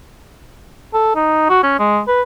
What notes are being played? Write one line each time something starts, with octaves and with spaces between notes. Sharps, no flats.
A4
D#4
F#4
C#4
G#3
B4